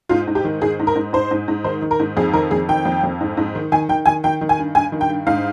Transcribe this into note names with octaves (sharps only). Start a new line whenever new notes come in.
G#2 F4
G#2
G4
D#3
G#2 G#4
G#2
A#4
G#2
G#2 C5
G#2
G#2
D#3 C5
D#3
A#4
G#2
F2 G#4
D#3 A#4
F2 G#4
D#3 G5
F2
F2
G#2
G#2
D#3
D#3 G#5
D#3 G5
D#3 G#5
D#3 G5
D#3
G#5
G2
G2 G#5
D#3
G5
G2
G#2 F5